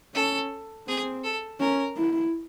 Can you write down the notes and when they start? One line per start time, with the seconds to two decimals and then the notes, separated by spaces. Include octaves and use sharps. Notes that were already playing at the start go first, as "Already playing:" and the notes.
0.14 C#4 A4
0.87 C4 G#4
1.24 A4
1.60 C#4 A#4
1.97 E4